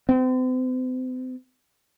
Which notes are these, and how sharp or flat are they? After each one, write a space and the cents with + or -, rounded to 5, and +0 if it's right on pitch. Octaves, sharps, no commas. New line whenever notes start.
C4 -40